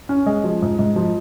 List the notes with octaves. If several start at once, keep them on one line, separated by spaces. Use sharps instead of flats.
C#4
G#3
F3
G#2
G#2
F3